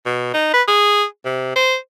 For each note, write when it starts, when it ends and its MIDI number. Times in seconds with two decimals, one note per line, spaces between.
0.05 0.30 47
0.34 0.53 63
0.54 0.63 71
0.68 1.04 68
1.25 1.54 48
1.56 1.77 72